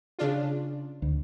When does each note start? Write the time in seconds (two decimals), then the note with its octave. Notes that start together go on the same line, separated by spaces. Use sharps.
0.19 C#3 D4 F4
1.02 D2